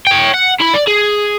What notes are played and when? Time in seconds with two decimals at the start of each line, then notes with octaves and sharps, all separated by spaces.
0.07 C#5 G5
0.34 F#5
0.61 E4 B5
0.74 D5
0.88 G#4